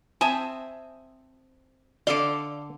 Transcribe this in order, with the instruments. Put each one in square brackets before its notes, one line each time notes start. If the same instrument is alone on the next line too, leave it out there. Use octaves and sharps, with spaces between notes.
[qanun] C4 E5 [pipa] G#5 A5 [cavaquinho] D#6
[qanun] D3 A4 C6 [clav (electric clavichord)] D5 [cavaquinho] F5 D6